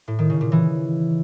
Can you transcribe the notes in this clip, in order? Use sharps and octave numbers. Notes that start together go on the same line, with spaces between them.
A2
D#3
C#3
A#2
E3